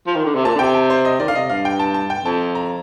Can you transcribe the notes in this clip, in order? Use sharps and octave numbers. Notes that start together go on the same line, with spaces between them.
F3
D#3
D3
C3
A#2 A5
D3
C3 G5
A5
C5
D#5
D#3 D5
D3 F5
C3 D#5
G2 F5
G5
A5
A5
G5
F2 A5
A#5